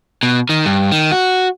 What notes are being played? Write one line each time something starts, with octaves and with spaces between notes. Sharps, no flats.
B2
D#3
G2
D#3
F#4